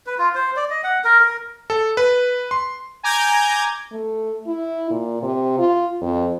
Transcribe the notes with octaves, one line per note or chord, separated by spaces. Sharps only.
B4
F4
C5
D5
D#5
F#5
A#4
A#4
A4
B4
C6
G#5 A#5 D6 G6 G#6
A3
E4
A#2
C3
F4
F2